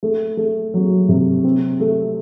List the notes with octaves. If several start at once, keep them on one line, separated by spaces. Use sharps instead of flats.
A3
A3
F#3
C3
C4
A3